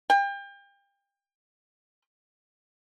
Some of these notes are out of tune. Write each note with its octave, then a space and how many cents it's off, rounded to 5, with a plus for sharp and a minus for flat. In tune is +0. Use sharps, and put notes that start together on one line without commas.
G5 +35